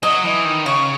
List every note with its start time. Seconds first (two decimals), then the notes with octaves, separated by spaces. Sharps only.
0.03 F#3 D#5
0.24 E3
0.45 D#3
0.65 C#3 C#5